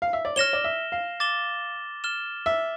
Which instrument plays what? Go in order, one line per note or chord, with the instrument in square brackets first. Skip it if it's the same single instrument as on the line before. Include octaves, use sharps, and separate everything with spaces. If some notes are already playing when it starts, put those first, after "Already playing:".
[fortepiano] F5
E5
D5
[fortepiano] C#5 [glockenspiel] F6 A#6 E7 G7
[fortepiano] D5
E5
F5
[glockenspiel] D6 A6 E7 G7
F6 A6 E7 G7
[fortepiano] E5